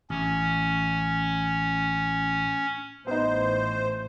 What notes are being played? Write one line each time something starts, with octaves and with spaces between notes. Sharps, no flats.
A1 C#4
A1 B3 D#4 C5